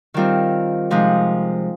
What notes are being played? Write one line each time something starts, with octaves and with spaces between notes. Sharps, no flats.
D#3 G3 C4 F4 A#4
C3 F3 G#3 D#4